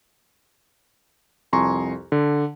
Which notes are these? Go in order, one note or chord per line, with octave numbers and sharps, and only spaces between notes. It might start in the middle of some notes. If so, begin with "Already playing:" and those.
C2 F2 G#5 A#5 C6 C#6
D3